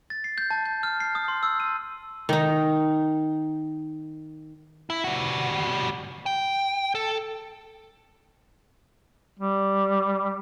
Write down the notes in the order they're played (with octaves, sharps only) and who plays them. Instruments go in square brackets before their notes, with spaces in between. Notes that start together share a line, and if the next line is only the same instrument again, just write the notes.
[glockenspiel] A6
C7
G6
A5
G6
F6
C7
D#6
C6
E6
D#7
[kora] D#3 D#4
[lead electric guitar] E4
G3 F#4
G5
A4
[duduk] G3